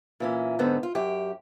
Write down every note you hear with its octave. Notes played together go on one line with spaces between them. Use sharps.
A#2 E3 C#4
G#2 D3 B3 C4
F4
F#2 G4